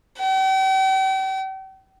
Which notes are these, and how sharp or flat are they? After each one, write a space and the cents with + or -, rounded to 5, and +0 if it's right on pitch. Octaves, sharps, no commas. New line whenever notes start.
G5 -40